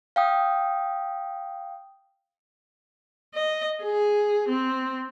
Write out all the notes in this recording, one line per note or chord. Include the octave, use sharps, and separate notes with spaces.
F5 G5 D#6
D#5
G#4
C4